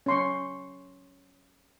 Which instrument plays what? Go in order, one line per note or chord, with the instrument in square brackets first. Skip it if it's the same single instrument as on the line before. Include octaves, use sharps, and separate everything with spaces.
[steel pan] C#4 C6 C#6